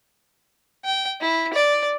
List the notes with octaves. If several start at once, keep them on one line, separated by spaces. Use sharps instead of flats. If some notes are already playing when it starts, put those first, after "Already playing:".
G5
E4
D5